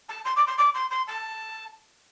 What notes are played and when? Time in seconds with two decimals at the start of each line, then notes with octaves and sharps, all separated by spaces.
0.08 A5
0.25 C6
0.36 D6
0.46 C6
0.57 D6
0.74 C6
0.90 C6
1.07 A5